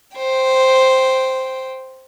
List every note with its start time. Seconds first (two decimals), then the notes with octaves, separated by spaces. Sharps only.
0.16 C5 G5